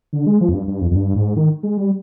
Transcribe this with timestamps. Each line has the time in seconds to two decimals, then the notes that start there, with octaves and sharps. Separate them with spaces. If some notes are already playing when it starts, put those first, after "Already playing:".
0.13 D3
0.27 G#3
0.41 F3
0.49 F2
0.54 G2
0.68 G2
0.81 F2
0.91 F2
0.95 G2
1.15 G#2
1.36 D#3
1.63 G#3
1.77 G3